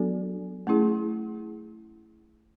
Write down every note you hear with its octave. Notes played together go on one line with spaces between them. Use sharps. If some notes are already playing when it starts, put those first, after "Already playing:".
Already playing: F#3 B3 D4 F#4 A4
A3 C#4 E4 G#4